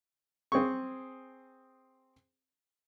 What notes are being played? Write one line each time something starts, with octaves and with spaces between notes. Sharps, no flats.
C4 G#4 C#6